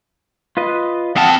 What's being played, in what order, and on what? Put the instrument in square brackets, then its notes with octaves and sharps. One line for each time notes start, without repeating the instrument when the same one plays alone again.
[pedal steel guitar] F4 B4 D#5
[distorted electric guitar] C4 A5 [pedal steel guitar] F#5 D#6